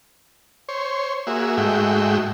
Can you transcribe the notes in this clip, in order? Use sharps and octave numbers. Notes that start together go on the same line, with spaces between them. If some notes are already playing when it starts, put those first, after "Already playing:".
C5 C#5
A#3 F#4 G#4 E5
G#2 G#3 A3 F#4 E5 G5